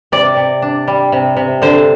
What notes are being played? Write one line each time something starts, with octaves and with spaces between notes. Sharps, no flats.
C3 D5
C3
D4
G3
C3
C3
D3 C5